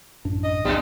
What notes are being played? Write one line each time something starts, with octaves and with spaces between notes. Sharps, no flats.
A1 F#2 D4
D#5
B1 E2 A#2 G3 D4